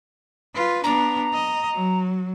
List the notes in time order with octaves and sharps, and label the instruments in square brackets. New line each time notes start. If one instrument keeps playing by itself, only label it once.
[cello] F4 B4
[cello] B3 D4 [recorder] A#5
[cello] D#5
F#3